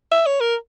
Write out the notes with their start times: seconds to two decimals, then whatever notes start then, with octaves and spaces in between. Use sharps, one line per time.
0.11 E5
0.26 C#5
0.40 A#4